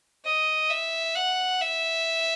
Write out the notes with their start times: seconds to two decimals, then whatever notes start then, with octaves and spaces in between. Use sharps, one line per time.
0.25 D#5
0.70 E5
1.15 F#5
1.61 E5